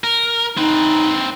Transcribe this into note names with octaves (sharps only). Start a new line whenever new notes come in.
A#4
C4 D#4 B4